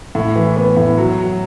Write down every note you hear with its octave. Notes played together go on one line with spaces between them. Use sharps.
A2
E3
B3
A2
F#3
F#3